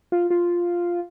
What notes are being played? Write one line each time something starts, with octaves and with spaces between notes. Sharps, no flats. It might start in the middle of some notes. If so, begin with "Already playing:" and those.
F4
F4